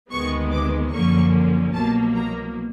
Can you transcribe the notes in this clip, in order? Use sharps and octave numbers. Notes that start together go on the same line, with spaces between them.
D2 C3 D#3 G#3 B3 C#6
D6
F#2 D3 F3 A#3 C#4 C#6
C2 B2 F#3 A#3 A5
A#5